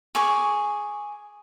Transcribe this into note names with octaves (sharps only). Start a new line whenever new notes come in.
G#4 C#6 D6